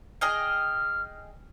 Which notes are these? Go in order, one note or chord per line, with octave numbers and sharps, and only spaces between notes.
G#4 D#5 G5 F6